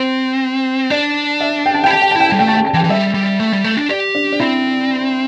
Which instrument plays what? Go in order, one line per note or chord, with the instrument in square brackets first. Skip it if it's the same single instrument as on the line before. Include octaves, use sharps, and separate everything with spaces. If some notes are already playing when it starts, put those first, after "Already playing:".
Already playing: [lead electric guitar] C4 [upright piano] C5
[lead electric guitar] D4 [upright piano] D5
[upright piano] E5
G5
A5
[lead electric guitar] E4 [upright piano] G5
[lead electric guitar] G4 [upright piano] A5
[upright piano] G5
A5
[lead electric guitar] E4 [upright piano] G5
[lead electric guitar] G3 [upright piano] A5
[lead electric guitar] A3 [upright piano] G5
[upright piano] A5
G5
A5
[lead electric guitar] E3 [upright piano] G5
[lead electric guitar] E3
[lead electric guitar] G3 [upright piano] E5
[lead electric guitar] G3
A3
G3
A3
D4
[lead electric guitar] G4 [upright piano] D5
[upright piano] D4
D4
[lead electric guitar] C4 [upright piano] E4